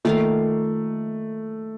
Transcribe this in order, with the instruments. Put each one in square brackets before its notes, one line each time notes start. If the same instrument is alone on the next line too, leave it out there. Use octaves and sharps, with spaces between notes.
[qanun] D#3 A#3 F4 A#4 [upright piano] A3